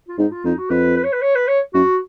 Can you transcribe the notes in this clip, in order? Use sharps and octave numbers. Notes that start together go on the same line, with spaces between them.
F4
G#2 D#4
F4
F2 D#4
F#4
F2 B4
B4
C#5
B4
C#5
B4
C#5
F#2 F#4